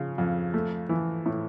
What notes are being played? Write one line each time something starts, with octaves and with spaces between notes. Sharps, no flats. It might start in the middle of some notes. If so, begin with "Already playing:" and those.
Already playing: C#3 F3
F2
A3
E3
A2